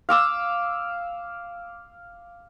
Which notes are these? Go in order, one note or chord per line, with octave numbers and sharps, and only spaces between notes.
F5 D6 E6